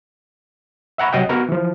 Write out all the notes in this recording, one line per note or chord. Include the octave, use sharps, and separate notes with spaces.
E5 F#5 A#5 B5 C#6
C2 F#3 D#5 F#5 G5
B3 F#4 A#4 A#5
E3 F3